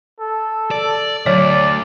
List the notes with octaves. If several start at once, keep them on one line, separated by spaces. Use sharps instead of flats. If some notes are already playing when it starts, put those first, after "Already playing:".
A4
D5
D2 F#3 C#5 D5